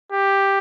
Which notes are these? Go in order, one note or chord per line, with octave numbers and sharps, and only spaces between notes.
G4